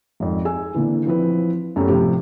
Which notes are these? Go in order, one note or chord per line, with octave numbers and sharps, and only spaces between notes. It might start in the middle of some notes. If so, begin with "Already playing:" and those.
G#1 F2
G#4 G#5 E6
A#2 D3 E3
E3 F3 C4 B4
F#2 G3 A3 C#4
A2 C3 F3 G4